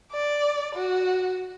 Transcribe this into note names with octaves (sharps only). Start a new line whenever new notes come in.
D5
F#4